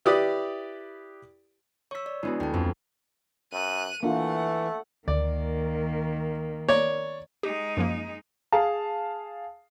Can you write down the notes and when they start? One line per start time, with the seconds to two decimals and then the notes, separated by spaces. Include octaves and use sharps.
0.05 E4 G4 B4 D5 D#6
1.91 C#5 C#6 E6 B6
2.06 D5
2.23 G#3 B3 D4 E4 F#4
2.40 D2 G5 A5
2.54 F2
3.53 F#2 F#6 D#7
4.03 E3 A3 A#3 D4 F4 F#5
5.08 D2 D#3 A#3 D5
6.68 C#5 D5 A#5 C#6
7.43 G#3 D#4 G4
7.77 F#2 F3 A#3
8.52 G#4 F5 A5